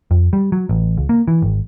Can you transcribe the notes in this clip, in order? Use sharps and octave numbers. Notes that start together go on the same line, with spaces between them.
F2
G3
F#3
A1
C#2
A#3
E3
G#1